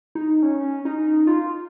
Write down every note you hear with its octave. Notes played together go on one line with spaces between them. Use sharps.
D#4
C#4
D#4
F4